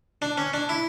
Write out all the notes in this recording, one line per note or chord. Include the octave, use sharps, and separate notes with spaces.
D4
C#4
D4
E4